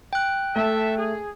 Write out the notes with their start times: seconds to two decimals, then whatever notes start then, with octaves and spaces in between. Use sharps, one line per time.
0.13 G5 F#6
0.56 A3 A4 E5
0.97 G#4